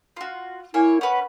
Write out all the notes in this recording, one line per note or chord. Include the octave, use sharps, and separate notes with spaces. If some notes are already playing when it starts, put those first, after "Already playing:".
F4 F#4
A#3 E4 C#5 G#5
C#4 B4 F#5